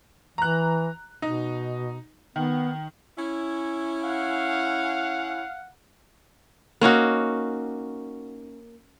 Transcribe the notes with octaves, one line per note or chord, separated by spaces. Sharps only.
E3 A#5 F#6
B2 D#4
D#3 B3
C#4 E4
F5 F#5
A#3 C#4 D#4 F#4